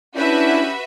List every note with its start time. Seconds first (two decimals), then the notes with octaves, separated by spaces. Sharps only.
0.15 C#4 D4 E4 F#4 G4 B4 E5